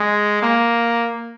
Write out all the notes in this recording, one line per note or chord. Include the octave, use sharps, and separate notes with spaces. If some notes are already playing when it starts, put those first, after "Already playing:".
Already playing: G#3
A#3